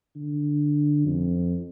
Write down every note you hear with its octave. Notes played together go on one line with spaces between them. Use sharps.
D3
F2